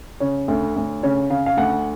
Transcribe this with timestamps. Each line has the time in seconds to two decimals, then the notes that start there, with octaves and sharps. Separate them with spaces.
0.20 C#3 C#5
0.48 D2
0.76 D2
1.03 C#3 C#5
1.30 C#3 F5
1.46 F5
1.57 D2 F#5